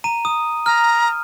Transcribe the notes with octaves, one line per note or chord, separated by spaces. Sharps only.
A#5 D#7
D#6
A#5 F6